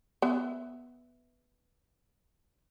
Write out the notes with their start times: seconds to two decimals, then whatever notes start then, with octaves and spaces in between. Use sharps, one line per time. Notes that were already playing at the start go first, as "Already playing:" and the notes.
0.22 B3 E5